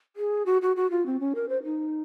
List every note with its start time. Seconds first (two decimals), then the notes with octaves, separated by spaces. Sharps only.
0.16 G#4
0.46 F#4
0.62 F#4
0.76 F#4
0.91 F4
1.06 C4
1.20 C#4
1.35 A#4
1.49 C5
1.64 D#4